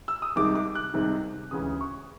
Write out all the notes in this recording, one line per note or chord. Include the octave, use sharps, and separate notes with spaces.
E6
D#6
C2 C3 D#3 G#3 D6
D6
F#6
C2 C3 D#3 G#3
D2 C#3 E3 G#3 C#4 D#6
C#6